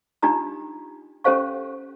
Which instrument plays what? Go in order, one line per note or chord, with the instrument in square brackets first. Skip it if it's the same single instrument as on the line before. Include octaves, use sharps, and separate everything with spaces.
[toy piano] D4 D#4 F4 G4 A#5 D#6
C#4 G4 A4 C5 F5 C#6